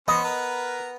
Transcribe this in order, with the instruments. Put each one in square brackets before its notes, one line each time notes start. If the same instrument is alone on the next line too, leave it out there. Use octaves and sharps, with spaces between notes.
[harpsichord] B3 [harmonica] C#4 C5 [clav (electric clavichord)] D#5
[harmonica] A#4 B4 A#5